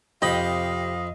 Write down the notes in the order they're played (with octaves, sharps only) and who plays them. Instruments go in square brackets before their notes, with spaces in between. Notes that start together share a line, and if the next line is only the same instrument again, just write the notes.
[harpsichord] F2 B5 [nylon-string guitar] C3 G4 [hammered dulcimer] D#5 [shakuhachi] F5